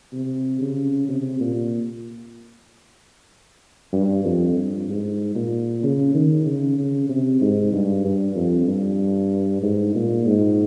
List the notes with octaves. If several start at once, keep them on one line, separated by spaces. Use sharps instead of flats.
C3
C#3
C3
A#2
G2
F2
G2
G#2
A#2
C#3
D#3
C#3
C#3
C3
G#2
G2
G2
F2
G2
G#2
A#2
G#2